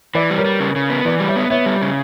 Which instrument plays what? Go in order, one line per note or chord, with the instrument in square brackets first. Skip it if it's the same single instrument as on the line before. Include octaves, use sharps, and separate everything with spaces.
[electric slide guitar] E3 [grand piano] B4 D5
[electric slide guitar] G3
[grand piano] A#4 C#5
[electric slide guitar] G3
C#3
C#3
B3
[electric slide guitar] E3 [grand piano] B4 D5
[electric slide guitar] G3
[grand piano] C#5 E5
[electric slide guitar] B3
[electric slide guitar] B3 [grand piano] C#5 E5
[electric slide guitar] G3
C#3